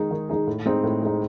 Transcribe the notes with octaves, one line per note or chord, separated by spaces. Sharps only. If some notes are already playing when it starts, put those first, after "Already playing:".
Already playing: D#3 G#3 D#4 G#4
D#3
G#3 D#4 G#4
A2
G#3 C4 D#4
A2
G#3 C4 D#4